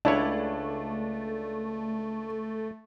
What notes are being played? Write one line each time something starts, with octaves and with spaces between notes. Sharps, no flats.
C#2 A3 D4 E4 C#5